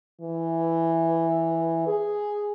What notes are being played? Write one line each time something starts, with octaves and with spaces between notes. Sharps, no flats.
E3
G#4